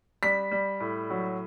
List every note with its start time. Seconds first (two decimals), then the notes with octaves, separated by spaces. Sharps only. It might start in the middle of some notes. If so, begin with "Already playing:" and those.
0.23 G3 B6
0.52 G3
0.80 A2
1.10 F#3